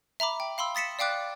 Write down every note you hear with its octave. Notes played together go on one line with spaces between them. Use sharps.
E5 A#5 B5 D6
G5
F5 B5 C6 E6
D#6 A6 B6 C#7 E7
D5 F5 G5 D6 F#6